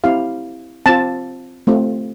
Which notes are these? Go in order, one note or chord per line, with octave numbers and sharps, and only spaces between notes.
C4 E4 G4 F5
C4 F4 A5
A3 C4 F4